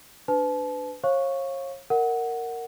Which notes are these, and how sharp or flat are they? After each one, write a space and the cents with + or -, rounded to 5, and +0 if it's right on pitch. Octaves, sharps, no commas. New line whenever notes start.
D4 +0 B4 +30 A5 -35
C#5 -35 F5 +0 C#6 +0
A#4 -10 D#5 +0 F#5 +0